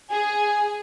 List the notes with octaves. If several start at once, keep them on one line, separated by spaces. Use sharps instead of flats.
G#4 G#5